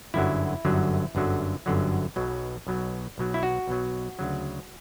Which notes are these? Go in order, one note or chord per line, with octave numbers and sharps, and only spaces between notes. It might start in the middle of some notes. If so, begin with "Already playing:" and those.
G1 F#2 D3 F#3 E4
G1 F#2 D3 F#3
G1 F#2 D3 F#3
G1 F#2 D3 F#3
B1 B2 F#3
B1 B2 F#3
B1 B2 F#3
E4
F#4
B1 B2 F#3
D2 C#3 F#3